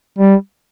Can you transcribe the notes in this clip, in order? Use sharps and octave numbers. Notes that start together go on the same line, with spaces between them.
G3